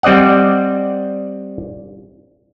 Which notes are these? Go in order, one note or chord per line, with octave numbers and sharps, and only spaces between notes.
G3 C4 D5 D#5 F#5